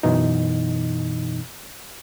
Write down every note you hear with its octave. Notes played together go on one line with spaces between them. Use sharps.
F#2 B2 E3 D#4